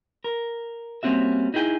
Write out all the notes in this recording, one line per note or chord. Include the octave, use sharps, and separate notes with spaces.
A#4
G3 A#3 C4 C#4 F#4 E5
D#4 E4 G#4 G5 G#5